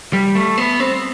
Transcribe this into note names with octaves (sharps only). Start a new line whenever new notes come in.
G3
A3
B3
C4